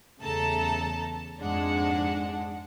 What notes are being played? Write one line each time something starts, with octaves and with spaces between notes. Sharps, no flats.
E2 C#3 A3 A4 A5 A#5
F2 G#2 G#3 D4 F#5